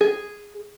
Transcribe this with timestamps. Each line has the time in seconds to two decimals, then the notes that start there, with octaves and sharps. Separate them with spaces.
0.01 G#4